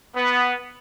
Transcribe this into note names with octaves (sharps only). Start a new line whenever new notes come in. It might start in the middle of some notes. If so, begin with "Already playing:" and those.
B3